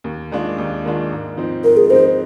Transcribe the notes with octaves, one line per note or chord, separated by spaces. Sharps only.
D#2
D#3 G#3 D4 F4
D#2
D#3 G#3 D4 F4
G#2
F3 C4 D#4
G#2 A#4
G#4
F3 C4 D#4 C5